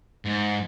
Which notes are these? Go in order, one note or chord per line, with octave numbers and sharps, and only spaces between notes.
G#2